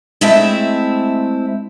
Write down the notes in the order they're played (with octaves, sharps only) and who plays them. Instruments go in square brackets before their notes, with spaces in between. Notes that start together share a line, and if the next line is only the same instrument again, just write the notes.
[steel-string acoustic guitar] G#3 A3 C4 E4 E5 A5